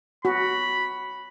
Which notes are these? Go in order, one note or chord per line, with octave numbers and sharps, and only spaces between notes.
F#4 B5